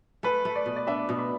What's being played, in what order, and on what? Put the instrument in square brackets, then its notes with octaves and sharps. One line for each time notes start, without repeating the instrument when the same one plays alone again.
[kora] A3 [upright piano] B4
[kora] A3
[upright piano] D5
[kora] B2
[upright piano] D5
[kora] D4 [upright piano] E5
[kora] B2
[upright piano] B5